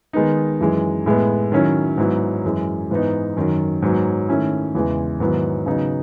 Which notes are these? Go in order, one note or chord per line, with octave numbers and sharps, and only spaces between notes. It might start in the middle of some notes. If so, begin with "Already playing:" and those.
D#3 G#3 B3 D#4
F#2 E3 G#3
A2 G#3 B3
D#3 F#3 C#4 E4
G#2 F#3 B3 E4
F#2 E3 G#3
G#2 E3 B3 D#4
F#2 D#3 F#3
G#2 F#3 B3
D#3 A3 C#4 E4
E2 C#3 E3 G#3
G#2 D#3 F#3 B3 E4
C#3 F#3 B3 D#4